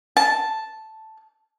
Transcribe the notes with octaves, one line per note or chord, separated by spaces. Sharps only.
A5